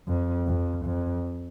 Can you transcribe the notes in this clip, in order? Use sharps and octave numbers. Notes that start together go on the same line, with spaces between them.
F2
F2
F2